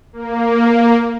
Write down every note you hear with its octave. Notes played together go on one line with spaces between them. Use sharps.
A#3